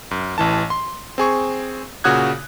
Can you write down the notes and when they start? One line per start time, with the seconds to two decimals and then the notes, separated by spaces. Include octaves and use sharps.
0.11 F#2
0.38 A1 E3 A5
0.70 C6
1.18 C4 G#4 C#6
2.04 A#2 C#3 F#4 D#6 F#6 G#6